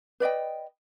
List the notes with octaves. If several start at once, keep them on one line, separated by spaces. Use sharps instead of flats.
B4 D5 D#5 G5